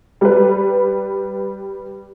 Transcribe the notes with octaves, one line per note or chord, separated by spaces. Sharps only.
G3 B4